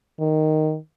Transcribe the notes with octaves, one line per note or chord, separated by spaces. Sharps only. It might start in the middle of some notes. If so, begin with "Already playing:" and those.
D#3